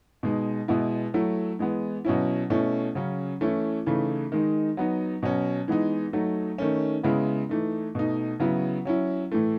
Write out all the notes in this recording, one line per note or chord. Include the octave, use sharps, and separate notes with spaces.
B2 G#3 D#4
B2 G#3 B3 E4
F#3 A3 E4
E3 G#3 B3
B2 F#3 C#4 E4
B2 A3 C#4 E4
C#3 F#3 C#4
E3 A3 C#4 E4
C#3 E3 A3 D#4
D#3 G#3 D#4
F#3 B3 D#4
B2 F#3 C#4
E3 G#3 B3 D#4
F#3 A3 D#4
D#3 A3 C#4
C#3 G#3 B3 E4
E3 A3 D#4
B2 A3 D#4
C#3 F#3 B3 E4
F#3 C#4 E4
A2 E3 A3